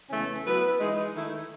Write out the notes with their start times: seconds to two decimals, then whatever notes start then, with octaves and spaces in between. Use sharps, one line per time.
0.09 E2 C#3 E3 A3 C#4
0.44 F#3 B3 E4 B4
0.78 E3 G#3 D#4 G#4
1.13 D#3 A3 E4